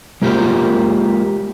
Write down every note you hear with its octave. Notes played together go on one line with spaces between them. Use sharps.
G#3 A#3 F4 G4 A#4 C5